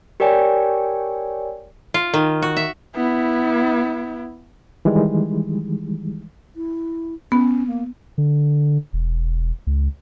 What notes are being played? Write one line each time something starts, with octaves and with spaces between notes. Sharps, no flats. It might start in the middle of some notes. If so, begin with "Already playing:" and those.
G4 A#4 C#5 D5 G5 G#5
F4
D#3
F#4
E5
B3 E4
D#3 E3 G3 G#3
E4
B3 C#4
A#3
D3
E1
C#2